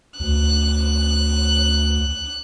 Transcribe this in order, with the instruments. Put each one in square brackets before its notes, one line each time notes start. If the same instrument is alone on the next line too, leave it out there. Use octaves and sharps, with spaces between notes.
[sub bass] D2 [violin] F#6